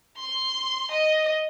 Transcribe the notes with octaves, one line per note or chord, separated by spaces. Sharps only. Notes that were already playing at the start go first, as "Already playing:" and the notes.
C6
D#5